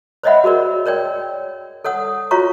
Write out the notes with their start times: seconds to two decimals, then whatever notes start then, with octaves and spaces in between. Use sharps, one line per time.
0.23 C5 C#5 D#5 E5 F#5 B5
0.44 F#4 G#4 A#4 D5
0.86 A#4 C#5 D5 G5
1.84 A4 C#5 F#5 D#6
2.31 F4 F#4 C#5 F5 A#5 C#6